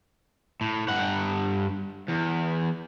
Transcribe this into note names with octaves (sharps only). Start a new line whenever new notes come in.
A2
G2 F#5
E2